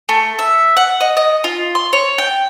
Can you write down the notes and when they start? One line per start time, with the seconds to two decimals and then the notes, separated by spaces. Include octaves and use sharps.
0.09 A3
0.39 E5
0.77 F#5
1.01 D#5
1.17 D#5
1.44 F4
1.75 C6
1.93 C#5
2.18 G5